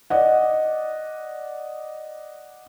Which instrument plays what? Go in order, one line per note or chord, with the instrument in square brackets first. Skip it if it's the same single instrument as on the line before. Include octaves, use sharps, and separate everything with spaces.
[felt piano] D5 D#5 F#5